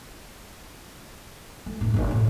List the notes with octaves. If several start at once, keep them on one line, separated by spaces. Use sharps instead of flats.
A3
F1 A2
G1 C#2
C2 A2